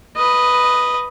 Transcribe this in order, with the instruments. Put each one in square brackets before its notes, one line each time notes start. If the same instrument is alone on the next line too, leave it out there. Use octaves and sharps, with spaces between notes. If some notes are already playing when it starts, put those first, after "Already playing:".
[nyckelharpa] B4 D#5